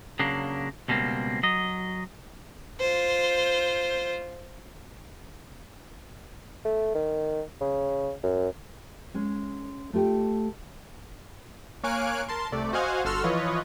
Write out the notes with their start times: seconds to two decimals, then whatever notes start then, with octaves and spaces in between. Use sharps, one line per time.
0.19 C#3 F#3 A#3 D4
0.88 C#2 B2 G3 A#3 C4
1.43 F#3 D#5
2.80 F4 C5
6.65 A3
6.95 D#3
7.61 C#3
8.23 F#2
9.14 G#3 C#4
9.93 A3 F4 G4 G5
11.83 A#3 C#5 F5 G#5 F#6 D7
12.29 A#4 A5 C6
12.52 C2 C3 A3 D5
12.73 F#4 C5 D#5 F5 F#5 G#5
13.05 G1 F#4 A4 C6 E6 F6
13.24 E3 F3 F4 B4 C#5 D#5